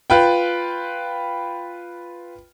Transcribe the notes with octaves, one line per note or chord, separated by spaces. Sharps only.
F4 B4 G5